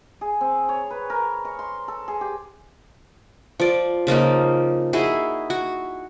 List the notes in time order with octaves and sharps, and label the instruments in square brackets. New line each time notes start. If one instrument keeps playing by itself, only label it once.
[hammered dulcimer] G#4
C4
C#5
B4
A#4
C#6
C6
A4
G#4
G4
[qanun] F3 D5
C#3 F3 A#3 D#4
D#4 E4 F#4 G#4
F#4